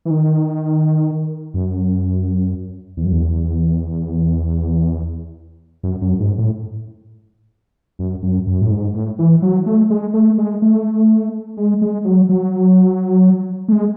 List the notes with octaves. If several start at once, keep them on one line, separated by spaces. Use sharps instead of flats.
E3
D#3
F#2
E2
F#2
E2
F#2
F#2
G#2
A2
F#2
F#2
F#2
A2
G#2
A2
E3
F#3
A3
G#3
A3
G#3
A3
G#3
G#3
F#3
F#3
A3
G#3